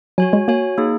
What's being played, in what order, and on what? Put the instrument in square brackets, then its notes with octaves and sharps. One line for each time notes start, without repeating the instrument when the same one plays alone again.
[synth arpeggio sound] F#3 [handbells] F#4 C#5 G#5
[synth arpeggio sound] G#3
[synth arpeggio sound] A#3 [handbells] F#4 C#5 G#5
[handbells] A#3 D#4 G#4